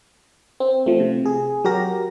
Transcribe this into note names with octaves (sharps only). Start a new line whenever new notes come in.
C4
F3 A3
C3
G#4
F#3 F#4 G4 A#4 A#6